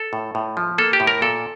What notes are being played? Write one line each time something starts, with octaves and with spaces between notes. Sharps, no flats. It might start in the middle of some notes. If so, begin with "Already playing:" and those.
Already playing: A4
A2
A2
F3
A#3 A4
G4
A2
A#4
A#2 A4